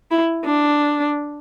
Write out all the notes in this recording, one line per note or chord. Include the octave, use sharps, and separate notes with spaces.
E4
D4